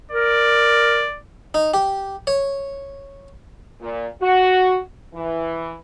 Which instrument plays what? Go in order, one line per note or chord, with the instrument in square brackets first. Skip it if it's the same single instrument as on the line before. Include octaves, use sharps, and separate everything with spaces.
[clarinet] A#4 [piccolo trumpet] D5
[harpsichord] D#4
G4
C#5
[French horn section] A#2
F#4
E3